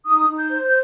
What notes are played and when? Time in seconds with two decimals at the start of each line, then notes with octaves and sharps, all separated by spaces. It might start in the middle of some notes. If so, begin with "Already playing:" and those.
0.06 D#4 D#6
0.29 D#4
0.37 G6
0.52 C5
0.67 G6